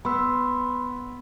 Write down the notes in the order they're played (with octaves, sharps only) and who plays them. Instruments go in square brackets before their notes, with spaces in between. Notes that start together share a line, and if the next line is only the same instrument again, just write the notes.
[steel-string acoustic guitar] B3 [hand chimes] B5 C6 E6